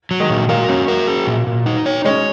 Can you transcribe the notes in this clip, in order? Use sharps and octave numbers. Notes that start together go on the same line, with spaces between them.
F#3
D#3 G#3
A#2
F#3 A#3 A#4
C#4
A#4
G#4
A#2
A#2
D#4
C#5
G#3 C#4 C#5